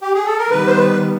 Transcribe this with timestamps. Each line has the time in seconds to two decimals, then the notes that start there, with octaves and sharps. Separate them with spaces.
0.01 G4
0.14 G#4
0.25 A4
0.38 A#4
0.50 D#3 G3 B3 B4
0.67 C5
0.78 B4